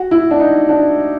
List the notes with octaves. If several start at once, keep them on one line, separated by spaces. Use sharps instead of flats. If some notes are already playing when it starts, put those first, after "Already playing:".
Already playing: F#4
E4
D4
D#4
D4